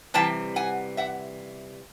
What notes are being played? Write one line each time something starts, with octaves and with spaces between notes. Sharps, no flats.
C3 E3 G3 G5 A5
F#5 G#5
E5 F#5